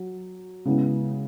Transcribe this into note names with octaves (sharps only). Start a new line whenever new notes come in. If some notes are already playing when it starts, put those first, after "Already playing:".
Already playing: F#3
C#3 G#3 B3 E4